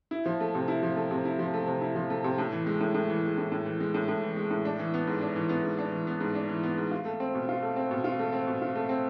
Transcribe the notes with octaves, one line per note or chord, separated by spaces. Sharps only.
E4
F3
A3
C3
E4
F3
A3
C3
E4
F3
A3
C3
E4
F3
A3
C3
A2
E3
G#3
A2
A2
E3
G#3
A2
A2
E3
G#3
A2
A2
E3
G#3
A2
D4
E3
B3
G#2
D4
E3
B3
G#2
D4
E3
B3
G#2
D4
E3
B3
G#2
F4
A3
C4
B2
F4
A3
C4
B2
F4
A3
C4
B2
F4
A3
C4